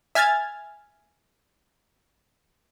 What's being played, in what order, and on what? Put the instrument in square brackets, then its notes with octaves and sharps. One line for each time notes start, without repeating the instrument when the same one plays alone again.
[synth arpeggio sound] E5 G#5 F6 G#6 A6